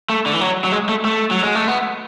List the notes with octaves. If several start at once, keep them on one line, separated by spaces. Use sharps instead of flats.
A3
D3
E3
F#3
F#3
G#3
A3
A3
F#3
G#3
A3
B3